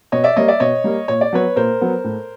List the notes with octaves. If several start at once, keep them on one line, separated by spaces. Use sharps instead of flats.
B2 C#5 D#5
D5 E5
G3 A#3 C#5 D#5
D5 E5
B2 C#5 D#5
G3 A#3
A#2 C#5
D5
F#3 B3 B4 C#5
A#2 A#4 C5
F#3 B3
A2